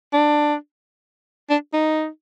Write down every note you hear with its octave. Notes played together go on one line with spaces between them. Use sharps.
D4
D4
D#4